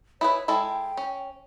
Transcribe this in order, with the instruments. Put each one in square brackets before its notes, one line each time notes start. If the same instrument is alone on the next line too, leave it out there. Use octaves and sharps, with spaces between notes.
[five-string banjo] E4 G#4 B4 [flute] C#5
[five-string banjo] G#3 E4 A4 [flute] G5
[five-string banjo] C#4